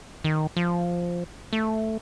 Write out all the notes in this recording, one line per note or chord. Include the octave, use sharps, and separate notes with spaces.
D#3
F3
A3